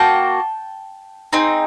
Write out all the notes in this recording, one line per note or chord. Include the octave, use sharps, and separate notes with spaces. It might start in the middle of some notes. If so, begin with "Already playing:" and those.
Already playing: A#3 F#4 G5 A5
C4 D#4 G#4